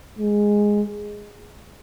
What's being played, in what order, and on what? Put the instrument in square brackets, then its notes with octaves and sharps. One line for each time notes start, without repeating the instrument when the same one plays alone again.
[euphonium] G#3